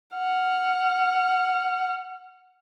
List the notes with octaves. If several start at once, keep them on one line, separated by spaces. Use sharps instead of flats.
F#5 F6